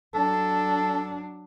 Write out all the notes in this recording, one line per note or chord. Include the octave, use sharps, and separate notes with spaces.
F#3 D4 A4